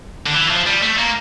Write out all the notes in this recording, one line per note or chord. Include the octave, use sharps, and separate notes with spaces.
D3
E3
F3
G3
A3
A#3